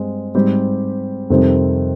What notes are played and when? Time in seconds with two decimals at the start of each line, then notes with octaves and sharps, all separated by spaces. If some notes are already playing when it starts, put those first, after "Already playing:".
Already playing: G2 G#3 C4
0.35 G#2 G3 C4 G4
1.30 F2 C3 D#3 G3 C4